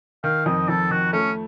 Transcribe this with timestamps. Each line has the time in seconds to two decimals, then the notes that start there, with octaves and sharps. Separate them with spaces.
0.24 D#3 F5
0.46 F2 D#5
0.68 F2 A4
0.91 D#3 F#4
1.13 A3 C#4